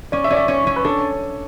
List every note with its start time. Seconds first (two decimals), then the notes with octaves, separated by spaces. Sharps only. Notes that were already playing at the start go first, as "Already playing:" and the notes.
0.12 C#4 D5
0.24 E5
0.30 C#4 D5
0.36 E5
0.48 C#4
0.67 C#4
0.76 B4
0.84 D4 A4